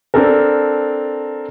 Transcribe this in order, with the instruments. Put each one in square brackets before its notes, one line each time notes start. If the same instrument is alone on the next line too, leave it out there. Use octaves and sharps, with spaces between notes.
[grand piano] C4 D4 A4 A#4